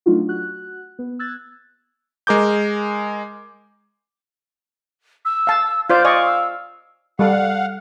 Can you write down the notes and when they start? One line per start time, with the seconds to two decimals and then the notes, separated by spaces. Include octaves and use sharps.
0.06 F#3 A3 D4 D#4 F4 F#4
0.28 F#4 F#6
0.99 B3
1.19 E6 F#6 G#6 A6
2.27 G#3 A#4 D6 G6
5.25 E6
5.47 F5 A5
5.90 F4 C5 D5 F5 G6
6.05 D5 D#5 G#5 C#6
6.26 E6
7.19 G3 A4 F5 F#5